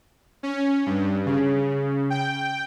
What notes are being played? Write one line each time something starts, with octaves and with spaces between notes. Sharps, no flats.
C#4
G2
C#3
G5